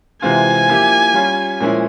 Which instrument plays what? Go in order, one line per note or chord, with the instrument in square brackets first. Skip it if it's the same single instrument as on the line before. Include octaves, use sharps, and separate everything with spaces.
[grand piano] C3 E3 G#3 C4 F4 [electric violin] G#5
[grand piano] F3 A#3 E4 G4
G3 C#4 F4
A#2 F3 G#3 C#4 E4